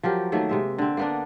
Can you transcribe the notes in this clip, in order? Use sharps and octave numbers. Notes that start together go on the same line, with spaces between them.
F3 F#3 G4 A#4
D#3 F#3 A3 A#3
C3 G#3 E5
D3 C4
A#3 B3 D4